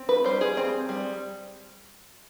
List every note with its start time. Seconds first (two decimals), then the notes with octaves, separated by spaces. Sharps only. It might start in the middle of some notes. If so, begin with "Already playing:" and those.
Already playing: C4
0.09 B4
0.24 G3 C5
0.41 G#4
0.57 C4
0.89 G3